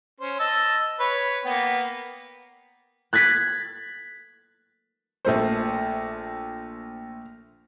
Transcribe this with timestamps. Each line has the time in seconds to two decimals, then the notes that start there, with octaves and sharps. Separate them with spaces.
0.20 C#4 C5
0.39 D#5 A5 E6
1.00 B4 C#5
1.45 A#3 B3 G5
3.13 F#6 G#6 A6 B6
5.25 A#1 A3 C5